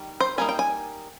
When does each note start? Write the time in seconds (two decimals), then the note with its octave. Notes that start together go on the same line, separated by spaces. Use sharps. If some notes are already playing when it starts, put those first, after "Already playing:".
Already playing: D#3 G3
0.21 C5
0.38 G3 A#3 D#4 G#5
0.49 G5
0.59 G#5